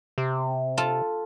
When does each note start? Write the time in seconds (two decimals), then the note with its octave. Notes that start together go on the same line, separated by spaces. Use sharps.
0.18 C3
0.78 F4 A4 A5